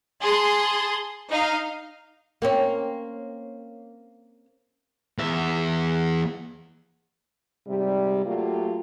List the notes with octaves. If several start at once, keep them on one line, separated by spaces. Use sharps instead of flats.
G#4 A5 C6
D#4 F5
A#3 C4 C#4
E2 E5
G#2 C3 G3
F#3 A3 A#3 F4 G4